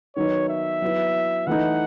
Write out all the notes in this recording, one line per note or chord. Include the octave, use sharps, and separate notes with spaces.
D#3 F#3 B3 D#4 C#5
E5
F#3 B3 E4
E3 A3 D#4 F#5